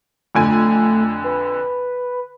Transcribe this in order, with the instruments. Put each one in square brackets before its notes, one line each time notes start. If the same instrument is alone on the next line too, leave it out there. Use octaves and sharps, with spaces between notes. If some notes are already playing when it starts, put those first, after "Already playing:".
[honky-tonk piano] F2 D3 G#5 [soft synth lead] A3
[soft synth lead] B4